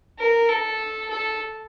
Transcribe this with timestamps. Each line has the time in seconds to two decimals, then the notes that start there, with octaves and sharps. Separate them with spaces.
0.19 A#4
0.50 A4
1.10 A4